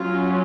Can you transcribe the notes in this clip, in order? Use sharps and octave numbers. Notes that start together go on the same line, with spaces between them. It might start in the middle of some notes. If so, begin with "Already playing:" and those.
Already playing: F#3 C#4 F4